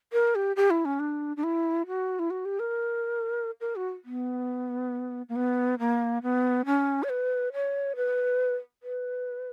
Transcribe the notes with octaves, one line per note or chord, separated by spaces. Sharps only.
A#4
G4
G4
E4
C#4
D4
D4
E4
F#4
E4
F#4
G4
A#4
A#4
F#4
B3
A#3
B3
A#3
B3
C#4
C#5
B4
C#5
B4
B4